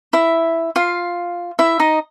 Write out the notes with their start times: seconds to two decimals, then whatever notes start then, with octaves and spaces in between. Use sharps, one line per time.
0.13 E4 E5
0.76 F4 F5
1.59 E4 E5
1.80 D#4 D#5